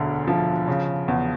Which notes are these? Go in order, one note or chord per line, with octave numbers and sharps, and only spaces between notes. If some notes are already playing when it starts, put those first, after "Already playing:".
Already playing: E1 D2 D3
F3
C#3
E2